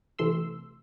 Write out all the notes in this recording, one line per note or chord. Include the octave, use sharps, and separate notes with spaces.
C3 E3 A3 C6 E6